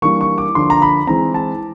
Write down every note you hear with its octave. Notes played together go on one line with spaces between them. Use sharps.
E3 G3 A#3 D4 C#6
C#6
D6
D3 F3 A#3 D4 C6
A#5
B5
E3 G#3 C4 A#5
A5